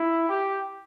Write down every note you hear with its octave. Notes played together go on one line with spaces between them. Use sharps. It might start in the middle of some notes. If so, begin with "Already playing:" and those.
Already playing: E4
G4